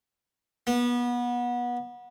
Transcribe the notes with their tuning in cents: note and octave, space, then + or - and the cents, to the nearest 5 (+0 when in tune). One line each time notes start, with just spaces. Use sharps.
B3 -25